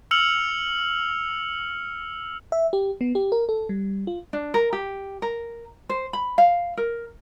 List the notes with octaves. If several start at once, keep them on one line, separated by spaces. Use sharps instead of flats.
E6 F6 C#7 F7 F#7
E5
G4
B3
G4
A#4
A4
G3
F4
D4
A#4
G4
A#4
C5
B5
F5
A#4